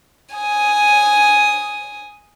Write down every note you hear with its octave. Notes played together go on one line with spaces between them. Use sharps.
G#5 D#6